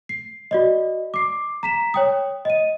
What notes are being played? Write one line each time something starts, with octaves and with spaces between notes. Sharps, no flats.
C7
F#4 D5 D#5
D6 C7
A#5 B6 E7
C#5 G5 D#6
D#5 D#7